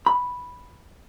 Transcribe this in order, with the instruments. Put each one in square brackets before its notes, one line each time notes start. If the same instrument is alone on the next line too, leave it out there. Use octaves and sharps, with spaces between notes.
[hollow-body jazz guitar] B5